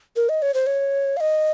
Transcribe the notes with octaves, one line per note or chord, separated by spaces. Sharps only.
A#4
D#5
C#5
C5
C#5
F5
D#5